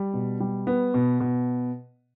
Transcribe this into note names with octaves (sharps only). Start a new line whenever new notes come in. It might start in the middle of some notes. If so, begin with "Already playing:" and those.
Already playing: G3
B2
G3
B3
B2
B2